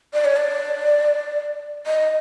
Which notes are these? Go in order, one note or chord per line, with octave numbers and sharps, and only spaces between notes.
D5
C#5
D5
D#5